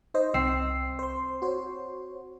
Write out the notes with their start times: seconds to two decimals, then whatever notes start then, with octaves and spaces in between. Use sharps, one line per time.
0.14 D#4 C5 D#5
0.34 C2 C4 E6 C7
0.99 C5 C6
1.42 F#4 C5 C#5